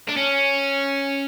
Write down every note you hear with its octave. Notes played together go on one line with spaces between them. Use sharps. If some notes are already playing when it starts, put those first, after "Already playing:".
D4
C#4